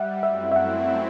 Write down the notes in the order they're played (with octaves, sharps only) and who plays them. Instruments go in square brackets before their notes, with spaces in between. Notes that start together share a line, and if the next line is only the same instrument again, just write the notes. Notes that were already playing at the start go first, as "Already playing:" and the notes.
Already playing: [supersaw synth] G3 [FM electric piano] E5 F#5
[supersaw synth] F#2 F#3 A3 C4 E4 [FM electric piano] E5
[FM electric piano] E5
F#5